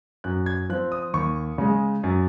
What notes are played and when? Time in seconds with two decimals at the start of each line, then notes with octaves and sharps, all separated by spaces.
0.24 F#2 F#6
0.46 G#6
0.69 F3 C4 F#6
0.92 D#6
1.13 D#2 C#6
1.58 C#3 G#3
2.04 F#2